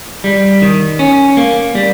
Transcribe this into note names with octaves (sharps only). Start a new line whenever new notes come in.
G3
D#3
C#4
A#3
G3